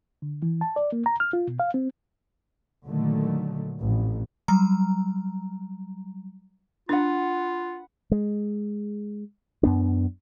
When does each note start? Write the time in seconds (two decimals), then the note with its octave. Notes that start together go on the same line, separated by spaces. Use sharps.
0.22 D3
0.42 E3
0.61 A5
0.76 D5
0.92 A#3
1.06 A#5
1.20 F6
1.33 F4
1.47 B2
1.60 F5
1.74 C4
2.86 A#2 D3 D#3 F#3 A3
3.82 A1 F2
4.48 F#3 G3 A#5
6.89 D4 F4 B4 F#5
8.11 G#3
9.63 F#2 B3 D4